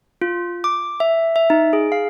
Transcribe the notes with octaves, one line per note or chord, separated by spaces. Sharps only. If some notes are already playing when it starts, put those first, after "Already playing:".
F4
D6
E5
E5
D#4
G#4
F5